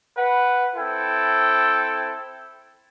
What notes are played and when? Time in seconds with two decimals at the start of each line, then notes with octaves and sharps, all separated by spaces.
0.16 B4 F#5
0.76 C4 E4 A4 G5